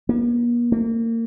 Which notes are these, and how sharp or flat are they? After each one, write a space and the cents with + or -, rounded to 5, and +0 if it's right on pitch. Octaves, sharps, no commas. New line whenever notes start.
A#3 +45
A#3 -30